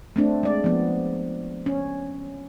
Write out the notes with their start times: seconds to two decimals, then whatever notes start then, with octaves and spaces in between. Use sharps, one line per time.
0.16 A3 C4 D4
0.43 G#3 D5
0.64 F3 B3
1.66 C#4